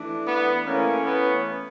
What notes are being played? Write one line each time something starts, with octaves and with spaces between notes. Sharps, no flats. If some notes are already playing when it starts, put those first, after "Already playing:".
Already playing: E3 A3 D4
B3
E3 A3 A#3 C#4
B3